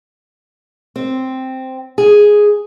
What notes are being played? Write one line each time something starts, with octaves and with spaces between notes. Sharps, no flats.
C4
G#4